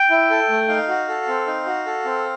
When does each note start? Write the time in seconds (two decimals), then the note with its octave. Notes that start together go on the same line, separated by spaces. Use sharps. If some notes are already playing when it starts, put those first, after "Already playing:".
Already playing: G5
0.10 E4
0.30 A4
0.49 A3
0.68 D#4 F5
0.88 F#4
1.08 A4
1.28 C4
1.47 D#4
1.66 F#4
1.87 A4
2.05 C4